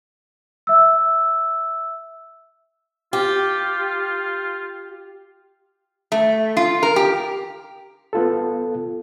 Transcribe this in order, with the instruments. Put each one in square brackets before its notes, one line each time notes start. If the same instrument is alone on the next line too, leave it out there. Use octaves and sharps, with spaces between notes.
[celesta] E5 E6
[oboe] F4 [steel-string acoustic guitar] G4
[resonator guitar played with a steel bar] A3
F4
A#4
G4
[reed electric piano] B3 F4 A4